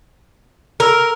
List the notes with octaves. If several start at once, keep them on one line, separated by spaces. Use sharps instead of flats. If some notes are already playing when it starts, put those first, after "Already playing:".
A#4 A#5 E6